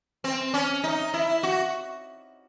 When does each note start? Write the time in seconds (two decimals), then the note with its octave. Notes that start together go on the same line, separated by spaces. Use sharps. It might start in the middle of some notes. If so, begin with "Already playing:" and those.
0.24 C4
0.54 C#4
0.84 D#4
1.14 E4
1.43 F#4